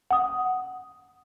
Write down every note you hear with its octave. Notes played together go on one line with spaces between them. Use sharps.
F#5 D#6